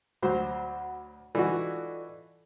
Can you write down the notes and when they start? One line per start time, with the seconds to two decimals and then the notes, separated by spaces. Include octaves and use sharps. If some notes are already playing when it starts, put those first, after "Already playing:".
0.22 D2 F#3 C5 F#5 B5
1.35 E3 D#4 F4 F#4 A4 D5